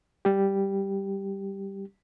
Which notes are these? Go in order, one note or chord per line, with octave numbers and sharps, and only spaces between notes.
G3 G4